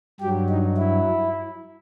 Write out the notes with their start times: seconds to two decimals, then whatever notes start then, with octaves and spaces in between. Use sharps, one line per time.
0.20 G2 F#3 G4
0.49 D#4
0.77 E4